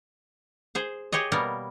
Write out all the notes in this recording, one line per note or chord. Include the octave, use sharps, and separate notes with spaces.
G#4 C5
G4 G#4 C#5 D#5
B2 G3 A#3 B3 A#4